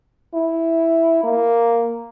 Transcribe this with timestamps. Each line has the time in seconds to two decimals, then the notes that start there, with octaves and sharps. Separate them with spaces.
0.34 E4
1.24 A#3